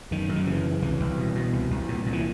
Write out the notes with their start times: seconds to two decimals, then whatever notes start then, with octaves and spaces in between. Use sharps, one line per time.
0.11 F#2 D#3
0.29 F#2
0.36 D#3
0.46 C#3 E3
0.64 C#3
0.82 C2 E3
1.00 C2
1.17 B2
1.35 B2
1.53 C2
1.70 C2
1.89 A#2
2.06 A#2
2.13 E3